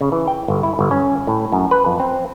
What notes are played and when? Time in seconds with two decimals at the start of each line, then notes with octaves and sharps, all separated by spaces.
0.01 C#3
0.12 E3
0.28 G5
0.48 G1
0.63 E4
0.79 G1
0.91 C#4
1.27 A2
1.52 F#2
1.71 B4
1.86 F2
2.00 C4